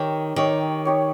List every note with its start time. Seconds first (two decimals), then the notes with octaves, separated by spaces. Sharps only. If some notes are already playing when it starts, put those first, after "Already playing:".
Already playing: D#3 D#4 G4 C#5
0.36 D#3 D#4 G4 C#5
0.85 D#4 G4 C#5